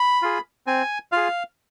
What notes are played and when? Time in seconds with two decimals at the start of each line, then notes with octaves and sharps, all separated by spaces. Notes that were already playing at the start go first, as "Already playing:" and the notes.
Already playing: B5
0.22 F4 G#4
0.67 C4 G#5
1.12 F4 G#4 F5